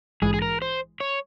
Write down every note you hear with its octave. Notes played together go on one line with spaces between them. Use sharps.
A#1 G#2 E3 G#3 G#4
G#4
A#4
C5
C#5